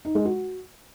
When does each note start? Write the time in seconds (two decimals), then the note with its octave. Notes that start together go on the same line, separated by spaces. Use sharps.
0.05 D#4
0.15 G#3
0.25 F#4